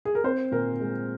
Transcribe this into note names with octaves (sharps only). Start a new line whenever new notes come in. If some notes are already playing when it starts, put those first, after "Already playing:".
G#4
A#4
C4 C5
A#2 A#4
G#3